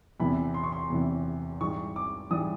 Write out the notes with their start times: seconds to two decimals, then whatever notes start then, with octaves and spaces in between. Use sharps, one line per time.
0.20 E2 C3 E3 B5
0.54 C6
0.64 C#6
0.72 C6
0.90 E2 C3 E3
1.61 G#2 E3 G3 C#6
1.96 D6
2.31 G#2 E3 G3 D#6